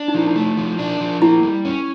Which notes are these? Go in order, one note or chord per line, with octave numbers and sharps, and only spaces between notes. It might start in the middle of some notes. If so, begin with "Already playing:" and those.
Already playing: D4
D#4
F3 E4
D#4
A3
F3
D4
F3
A#3 E4
G3
C#4